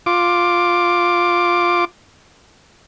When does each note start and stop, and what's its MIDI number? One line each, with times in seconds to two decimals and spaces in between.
0.06 1.85 65
0.06 1.85 86